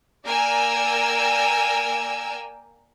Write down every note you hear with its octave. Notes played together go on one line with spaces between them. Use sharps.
A#3 A#4 D5 G5 G#5 E6